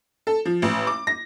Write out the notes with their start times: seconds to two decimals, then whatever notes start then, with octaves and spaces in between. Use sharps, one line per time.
0.27 A4
0.45 F3
0.62 A1
0.87 D6
1.07 A#6